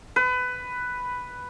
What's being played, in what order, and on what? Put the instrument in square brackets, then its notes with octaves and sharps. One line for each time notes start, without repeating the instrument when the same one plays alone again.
[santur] B4